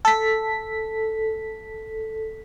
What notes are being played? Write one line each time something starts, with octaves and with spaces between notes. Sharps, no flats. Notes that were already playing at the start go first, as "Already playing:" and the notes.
A4 B6